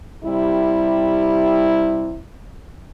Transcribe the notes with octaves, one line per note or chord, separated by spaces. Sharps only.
C3 G3 E4